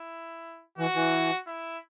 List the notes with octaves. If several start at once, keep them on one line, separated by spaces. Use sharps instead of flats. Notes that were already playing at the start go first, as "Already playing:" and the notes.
Already playing: E4
E3 F#4
E3
E4